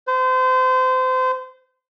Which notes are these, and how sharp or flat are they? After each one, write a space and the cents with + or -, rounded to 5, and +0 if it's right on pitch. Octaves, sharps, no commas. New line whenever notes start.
C5 -30